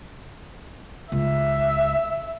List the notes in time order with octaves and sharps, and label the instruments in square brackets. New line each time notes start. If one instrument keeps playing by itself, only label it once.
[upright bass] C#2 [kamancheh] E5